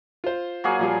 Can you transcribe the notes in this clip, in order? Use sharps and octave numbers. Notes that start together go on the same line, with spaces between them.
F4 C5
F#3 A#3 G#4
A#2 F3 G3